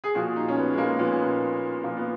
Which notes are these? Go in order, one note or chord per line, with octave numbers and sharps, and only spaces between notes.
G#4
A#2 F3 F#4
D#4
C#4
B3
G#3
A#3
A#2 F3 B3
C#4
B3
A#2 F3 A#3
B3